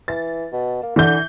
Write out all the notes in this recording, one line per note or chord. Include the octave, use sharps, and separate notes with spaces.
E3 A6
B2
A#3
D3 E3 G6